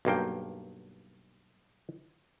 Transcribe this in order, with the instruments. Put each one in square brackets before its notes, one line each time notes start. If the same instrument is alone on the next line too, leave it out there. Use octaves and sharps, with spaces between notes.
[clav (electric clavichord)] B1 G2 A#3 G5